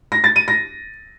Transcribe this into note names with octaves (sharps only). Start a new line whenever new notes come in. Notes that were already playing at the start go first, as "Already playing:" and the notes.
A#6
A6
D#7
A#6